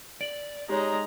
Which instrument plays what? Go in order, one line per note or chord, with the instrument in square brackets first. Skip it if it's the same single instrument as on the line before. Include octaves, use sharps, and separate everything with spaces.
[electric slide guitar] D5 [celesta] D7 F#7
[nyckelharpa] G#3 D#4 [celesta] G4 C#5 [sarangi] A#5